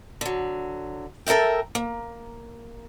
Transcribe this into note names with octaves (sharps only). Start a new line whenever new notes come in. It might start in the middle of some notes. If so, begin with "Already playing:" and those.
D3 F#3
A4 A#4 C#5 E5 G5
A#3